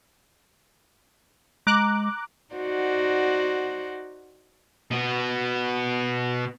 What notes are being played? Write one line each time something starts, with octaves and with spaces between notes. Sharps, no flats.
G#3 A#5 D6 F#6
D#4 F#4 C5 D5 F#5
B2 B3